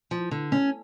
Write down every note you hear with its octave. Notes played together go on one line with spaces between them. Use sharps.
F3
D3
C#4